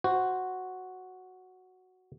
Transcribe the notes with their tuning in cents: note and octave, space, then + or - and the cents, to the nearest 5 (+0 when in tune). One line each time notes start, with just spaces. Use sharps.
F#4 +0 C5 +0